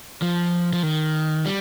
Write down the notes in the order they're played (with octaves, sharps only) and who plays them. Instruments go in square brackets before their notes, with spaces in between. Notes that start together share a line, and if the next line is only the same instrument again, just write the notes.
[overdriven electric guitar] F3
F3
D#3
G3